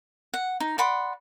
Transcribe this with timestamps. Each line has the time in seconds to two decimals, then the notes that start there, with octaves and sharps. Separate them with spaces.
0.34 F#5
0.60 D#4
0.78 D5 F#5 B5 C6